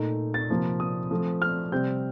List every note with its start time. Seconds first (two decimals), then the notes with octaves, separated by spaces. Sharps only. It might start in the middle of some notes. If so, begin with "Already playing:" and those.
Already playing: A#2 A3 D#4
0.34 A6
0.50 C3 F3 A#3
0.80 D#6
1.11 F3 A3 C4
1.42 F6
1.72 C3 G3 C4 G6